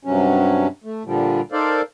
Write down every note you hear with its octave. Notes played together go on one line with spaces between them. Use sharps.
G2 C3 F#3 C#4
A3
A#2 D3 F3 G3
D#4 A4 A#4 C5 D5 F5